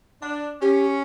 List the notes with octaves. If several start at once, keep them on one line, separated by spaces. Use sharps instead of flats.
D4
C#4 G4